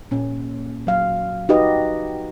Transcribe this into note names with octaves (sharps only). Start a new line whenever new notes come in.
A#2 C#4
F#3 F5
D#4 F#4 G4 B4 D#5